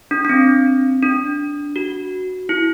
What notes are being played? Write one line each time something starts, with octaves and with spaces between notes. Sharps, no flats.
D4
D4
C4
D4
F#4
E4